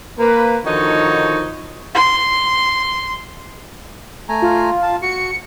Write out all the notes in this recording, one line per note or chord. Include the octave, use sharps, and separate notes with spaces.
A#3 B4
D3 D#3 F3 D#4 F#4 C#5
C6
A3 G#5 A#5
F4
F5 A5
F#4 C#7